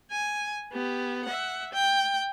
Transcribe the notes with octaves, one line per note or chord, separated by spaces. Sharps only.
G#5
B3 G4
E5 F#5
G5